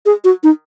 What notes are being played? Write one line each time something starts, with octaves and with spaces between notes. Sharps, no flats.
G#4
F#4
D#4